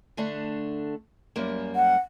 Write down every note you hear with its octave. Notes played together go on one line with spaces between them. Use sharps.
D3 A3 D4
F#2 G3 A#3
F#5